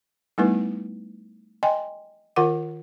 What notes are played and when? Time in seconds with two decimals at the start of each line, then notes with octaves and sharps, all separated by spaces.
0.38 G3 A3 B3 D#4 E4 B4
1.63 D#5 G5 G#5 C6
2.36 D#3 F4 A#4 F#5 D6